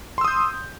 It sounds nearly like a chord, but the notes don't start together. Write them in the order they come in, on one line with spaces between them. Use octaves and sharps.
C6 E6 D#6 G6